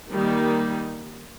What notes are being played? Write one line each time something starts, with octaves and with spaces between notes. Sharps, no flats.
D#3 G3 A#3 D#4